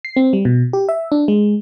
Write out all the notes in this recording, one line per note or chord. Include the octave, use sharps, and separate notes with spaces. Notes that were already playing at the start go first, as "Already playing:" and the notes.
C7
C4
G3
B2
G4
E5
D4
G#3